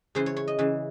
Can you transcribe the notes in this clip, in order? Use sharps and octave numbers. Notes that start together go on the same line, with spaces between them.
C#3 E3 C5
C#5
C#5
D#5
C#3 E3